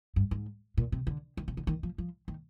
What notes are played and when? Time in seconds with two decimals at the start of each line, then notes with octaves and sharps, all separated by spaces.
0.16 G2
0.31 G#2
0.78 A#2
0.92 C3
1.07 D3
1.37 D#3
1.48 C3
1.57 D3
1.67 D#3
1.83 F3
1.98 F3
2.28 D#3